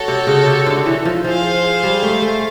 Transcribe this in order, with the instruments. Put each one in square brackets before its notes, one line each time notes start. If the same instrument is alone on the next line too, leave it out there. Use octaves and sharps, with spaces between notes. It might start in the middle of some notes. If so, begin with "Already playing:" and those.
Already playing: [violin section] F#4 A4 C#5
[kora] C3
C#3
C3
D3
E3
F3
[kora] F3 [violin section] G#4 C5 F5
[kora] G3
A3
A3